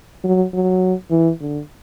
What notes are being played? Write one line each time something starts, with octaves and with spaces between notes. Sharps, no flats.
F#3
F#3
E3
D3